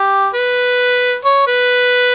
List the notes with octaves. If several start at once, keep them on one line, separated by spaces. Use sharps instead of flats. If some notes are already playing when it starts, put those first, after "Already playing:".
Already playing: G4
B4
C#5
B4